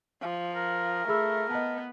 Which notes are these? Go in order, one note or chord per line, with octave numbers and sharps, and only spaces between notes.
F3
A#4
A3 G#4 B5 E6
B3 D#5 A5